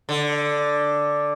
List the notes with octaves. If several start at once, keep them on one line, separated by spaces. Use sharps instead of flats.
D3